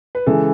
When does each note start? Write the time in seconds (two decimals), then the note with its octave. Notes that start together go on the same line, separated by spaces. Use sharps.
0.15 B4
0.26 C#3 E3 G#3 A4